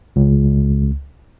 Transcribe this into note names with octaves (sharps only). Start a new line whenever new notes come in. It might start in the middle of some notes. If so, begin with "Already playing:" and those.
C#2